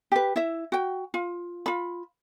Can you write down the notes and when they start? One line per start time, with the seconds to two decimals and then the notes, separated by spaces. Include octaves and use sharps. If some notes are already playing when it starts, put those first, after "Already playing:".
0.12 G4 B4
0.36 E4 E5
0.72 F#4 G5
1.14 F4
1.66 F4 B5